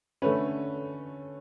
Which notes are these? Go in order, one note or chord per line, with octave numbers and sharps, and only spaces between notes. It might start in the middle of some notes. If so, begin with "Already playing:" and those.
D3 A3 C#4 B4